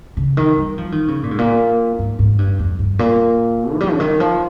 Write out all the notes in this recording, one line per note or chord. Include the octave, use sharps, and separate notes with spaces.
C#3
D#3
G3
F3
D#3
C#3
A#2
G#2
A#2
G#2
G#2
G2
F2
G2
A#2
F3
G3
C#3
D#3
F3